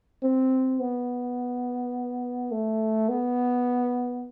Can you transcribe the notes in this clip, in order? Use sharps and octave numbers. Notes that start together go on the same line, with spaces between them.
C4
B3
A3
B3